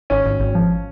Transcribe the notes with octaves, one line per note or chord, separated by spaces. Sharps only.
G#1 C#4
G#1
G#1
F3